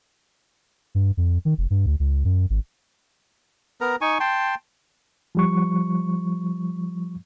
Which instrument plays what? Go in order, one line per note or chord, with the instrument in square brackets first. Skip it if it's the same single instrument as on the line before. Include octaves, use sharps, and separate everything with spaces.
[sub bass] G2
F2
D#3
F1
G2
D2
C#2
F#2
G#1
[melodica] B3 A#4 A#5
D#4 G#5 C#6
G5 A5 C6
[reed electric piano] F3 G3 C#6